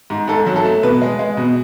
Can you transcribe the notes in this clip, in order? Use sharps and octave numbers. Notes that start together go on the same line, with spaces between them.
G#2
G#2 A4
F#3
A4
A3
B2 B4
G#3
G#3
B2